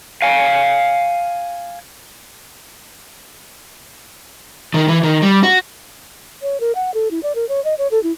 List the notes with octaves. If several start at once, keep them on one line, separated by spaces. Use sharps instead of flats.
F5 G#5
D#3
E3
D#3
G3
F#4
C#5
A#4
F#5
A4
E4
D5
A#4
C#5
D#5
C#5
A4
E4